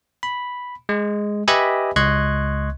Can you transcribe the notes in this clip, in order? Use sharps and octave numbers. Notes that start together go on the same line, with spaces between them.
B5
G#3
G4 B4 D#5 E5 G#5 B5
C#2 D#5 C6 C#6 F#6 G#6